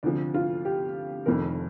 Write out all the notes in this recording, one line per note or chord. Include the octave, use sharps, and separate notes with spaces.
D2 C3 F3 D4
F4
G4
F1 F2 D#3 A#4